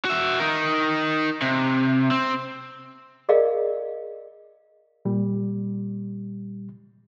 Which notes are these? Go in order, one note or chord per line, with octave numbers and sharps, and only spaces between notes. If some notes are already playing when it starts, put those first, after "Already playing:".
F#4 E5
D#4 A#4
C3
C4
G#4 A#4 D5 D#5 F5
A#2 G3